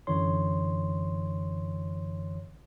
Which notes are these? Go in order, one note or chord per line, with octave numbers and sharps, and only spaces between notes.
F#2 D3 E3 C#5 C6